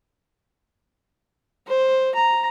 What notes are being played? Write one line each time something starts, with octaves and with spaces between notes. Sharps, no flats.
C5
A#5